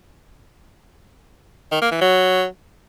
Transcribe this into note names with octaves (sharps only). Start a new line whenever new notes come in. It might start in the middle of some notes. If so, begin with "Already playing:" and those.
D#3
A#3
E3
F#3